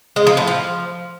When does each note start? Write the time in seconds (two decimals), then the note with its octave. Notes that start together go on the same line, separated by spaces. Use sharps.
0.16 G#3
0.27 F3
0.37 A2
0.47 F3